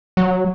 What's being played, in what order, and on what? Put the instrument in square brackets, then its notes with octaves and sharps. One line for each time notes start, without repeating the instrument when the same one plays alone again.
[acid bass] F#3